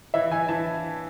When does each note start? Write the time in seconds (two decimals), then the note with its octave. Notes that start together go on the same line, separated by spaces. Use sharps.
0.14 E3 E5
0.31 E3 G#5
0.49 E3 A5